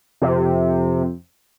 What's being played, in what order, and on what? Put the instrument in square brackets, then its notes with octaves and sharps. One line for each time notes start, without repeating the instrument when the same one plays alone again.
[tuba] F2 [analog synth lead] C3